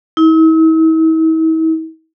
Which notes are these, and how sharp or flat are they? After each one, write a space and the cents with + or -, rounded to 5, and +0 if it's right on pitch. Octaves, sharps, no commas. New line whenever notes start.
E4 -45